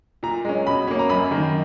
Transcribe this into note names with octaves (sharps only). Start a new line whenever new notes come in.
A#2 A#5
G#3 C#4
B2 B5
A#3 C#4
A#5
F#2 B5
D#3 A#3